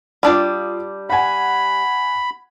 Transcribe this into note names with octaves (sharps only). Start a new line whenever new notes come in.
G3 D4 F4 D5 D#6
F#5 G#5 B5